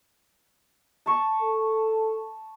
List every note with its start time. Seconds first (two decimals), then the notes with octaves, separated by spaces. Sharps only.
1.06 A5 C#6
1.41 A4